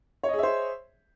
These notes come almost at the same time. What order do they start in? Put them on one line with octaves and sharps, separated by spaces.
C#5 D#5 G#4 E5 C5